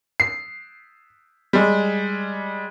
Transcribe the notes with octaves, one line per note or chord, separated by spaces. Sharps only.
C7
G3 G#3